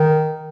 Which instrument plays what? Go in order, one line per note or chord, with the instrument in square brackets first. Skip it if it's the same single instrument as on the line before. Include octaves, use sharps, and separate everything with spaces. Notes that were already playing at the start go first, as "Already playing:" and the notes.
Already playing: [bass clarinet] D#3